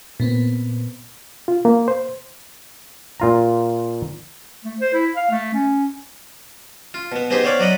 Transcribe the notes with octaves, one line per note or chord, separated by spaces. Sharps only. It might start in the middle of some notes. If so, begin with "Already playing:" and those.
A#2 B3 C4
F4
A#3
C5
A#2 F4 A#5
A3
C5
E4
F5
A3
C#4
F4
B2 B3
B3 C4 D#4 G4 G#4 C5
B3 C4 C#5 D5 F5
F#3 D5 D#5 F#5 B5